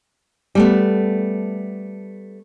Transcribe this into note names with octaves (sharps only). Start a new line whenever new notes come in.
G3 A3 B3